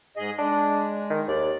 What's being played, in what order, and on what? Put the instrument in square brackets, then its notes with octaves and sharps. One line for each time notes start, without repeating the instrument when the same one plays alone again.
[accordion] G#2 G#4 D#5
[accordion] G#3 [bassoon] D4
[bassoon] D#3
[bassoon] D#2 [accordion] D5